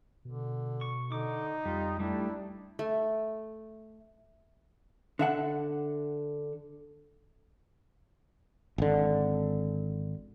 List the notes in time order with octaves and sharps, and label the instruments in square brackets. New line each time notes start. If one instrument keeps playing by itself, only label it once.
[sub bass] B2 [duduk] D3
[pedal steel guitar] C#6
[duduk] D3 [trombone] D#4 [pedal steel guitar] D6
[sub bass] F2 [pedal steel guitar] G3 [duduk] F4
[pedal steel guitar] G3 A3 [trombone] D4 [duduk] E4
[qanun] A3
[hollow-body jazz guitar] D3 E5 F#5
[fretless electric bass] G#1 D3